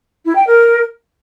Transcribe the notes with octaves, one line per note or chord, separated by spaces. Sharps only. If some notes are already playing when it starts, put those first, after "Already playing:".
E4
G5
A#4